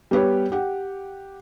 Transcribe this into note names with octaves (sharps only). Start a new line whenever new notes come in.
G3 B3 G4 B4 C#5
G4 F#5